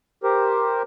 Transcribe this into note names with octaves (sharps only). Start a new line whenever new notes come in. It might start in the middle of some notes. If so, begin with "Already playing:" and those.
G4 A#4 C5